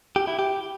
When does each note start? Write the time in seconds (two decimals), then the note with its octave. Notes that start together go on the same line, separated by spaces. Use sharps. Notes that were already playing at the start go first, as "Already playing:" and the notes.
0.16 G4
0.27 E4
0.39 G4